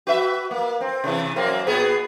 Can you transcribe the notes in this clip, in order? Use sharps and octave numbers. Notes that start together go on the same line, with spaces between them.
F#4 B4 E5
A#3
C4
C3 E3
F#2 A#3 C4
A#2 B3 G#4